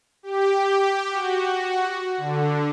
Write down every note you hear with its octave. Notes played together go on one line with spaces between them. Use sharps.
G4
F#4
D3